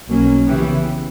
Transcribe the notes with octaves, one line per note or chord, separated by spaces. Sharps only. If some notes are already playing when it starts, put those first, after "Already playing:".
B1 B2 F#3 A#3 C#4
C#3 E3 B3 E4 G4